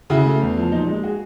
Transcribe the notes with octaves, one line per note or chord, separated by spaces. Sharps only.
C#3 E4 F#4
A3
E2
F3
A#2 D#4
G#3
F#4 G#4